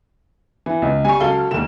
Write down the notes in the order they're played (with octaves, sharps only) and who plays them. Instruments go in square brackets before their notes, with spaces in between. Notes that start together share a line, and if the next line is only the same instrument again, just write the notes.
[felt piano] E3
C#2
[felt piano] G3 [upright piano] G#5 C#6
[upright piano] C#2 F5 G7 [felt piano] F#3 A4
[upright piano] F1 D#2 [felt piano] E7